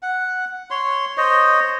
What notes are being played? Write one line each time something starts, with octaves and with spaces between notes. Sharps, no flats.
F#5
C#5 C6
C5 C#5 D#5